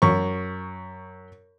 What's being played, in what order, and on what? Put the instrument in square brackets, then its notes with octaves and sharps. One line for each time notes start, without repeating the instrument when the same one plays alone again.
[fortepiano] F#2 C#6